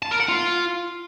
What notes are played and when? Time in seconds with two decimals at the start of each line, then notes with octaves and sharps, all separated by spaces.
0.02 A5
0.11 A#4
0.20 F#5
0.29 F4